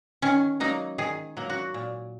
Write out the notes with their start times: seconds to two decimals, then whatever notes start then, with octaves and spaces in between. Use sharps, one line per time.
0.22 D#3 C#4
0.60 F#3 A#3 D#4
0.98 D#3 G#4
1.37 F#3 A#3
1.50 F#4
1.74 A#2